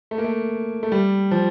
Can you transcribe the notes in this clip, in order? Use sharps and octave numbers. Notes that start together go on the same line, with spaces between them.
A3
A#3
A3
A3
G3
F3